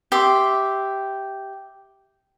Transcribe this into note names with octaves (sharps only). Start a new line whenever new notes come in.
G4 E5 C6